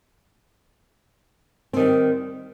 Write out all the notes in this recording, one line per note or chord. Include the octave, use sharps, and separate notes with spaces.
D#3 G3 C4